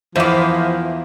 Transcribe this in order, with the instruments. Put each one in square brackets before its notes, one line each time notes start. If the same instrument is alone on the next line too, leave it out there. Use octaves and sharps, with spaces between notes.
[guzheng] E2 [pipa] E3 A#3 [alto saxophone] F3 [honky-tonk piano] C5 E5 F5